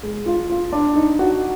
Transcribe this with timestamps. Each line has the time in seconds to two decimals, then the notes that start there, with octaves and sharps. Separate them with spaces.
0.03 G#3
0.26 F4
0.50 F4
0.72 D4
0.95 D#4
1.19 F#4